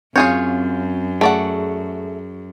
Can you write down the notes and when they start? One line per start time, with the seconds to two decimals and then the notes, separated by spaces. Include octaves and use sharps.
0.16 F#2 C4 F4 G#4 C#5 G6
1.21 A3 G#4 D5 F#5